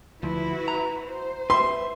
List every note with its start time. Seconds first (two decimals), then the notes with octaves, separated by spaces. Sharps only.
0.23 D2 F3 E4 F#4 B4
0.68 A#5
1.07 C5
1.50 B4 E5 C6